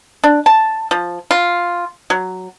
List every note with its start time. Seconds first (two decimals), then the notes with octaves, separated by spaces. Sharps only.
0.24 D4
0.46 A5
0.91 F3
1.31 F4
2.10 F#3